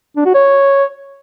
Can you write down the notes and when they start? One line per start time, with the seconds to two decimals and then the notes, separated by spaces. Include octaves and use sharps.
0.16 D4
0.25 F#4
0.35 C#5